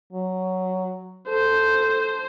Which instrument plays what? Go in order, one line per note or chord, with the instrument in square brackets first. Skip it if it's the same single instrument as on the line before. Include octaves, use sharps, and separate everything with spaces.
[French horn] F#3
[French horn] A4 [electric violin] C5